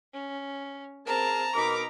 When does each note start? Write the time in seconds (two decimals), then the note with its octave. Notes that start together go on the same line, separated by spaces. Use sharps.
0.13 C#4
1.07 C4 G#4 A#4 A5 A#5
1.55 B2 D#4 A#4 B5 D6